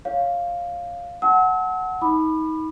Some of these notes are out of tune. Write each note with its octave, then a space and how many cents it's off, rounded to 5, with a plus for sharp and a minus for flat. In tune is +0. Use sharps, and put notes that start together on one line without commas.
C#5 +0 F5 +0
F#5 +0 A5 -10 E6 -40
D#4 +25 B5 +0 D6 +45